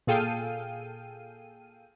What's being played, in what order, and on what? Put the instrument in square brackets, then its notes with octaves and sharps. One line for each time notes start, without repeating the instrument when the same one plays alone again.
[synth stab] A#2 G#4 A4 F5 G5 D#7